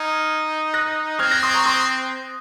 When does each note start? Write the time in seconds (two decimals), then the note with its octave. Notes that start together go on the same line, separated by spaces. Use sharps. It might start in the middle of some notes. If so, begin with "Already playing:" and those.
Already playing: D#4 F6 G#6
0.74 F#6 A#6
1.19 C4 F6 G#6
1.31 F#6 A#6
1.43 C6 D#6
1.54 A#5 C#6
1.66 C6 D#6